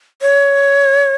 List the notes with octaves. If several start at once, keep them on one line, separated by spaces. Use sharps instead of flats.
C#5